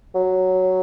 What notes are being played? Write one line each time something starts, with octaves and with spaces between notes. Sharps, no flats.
F#3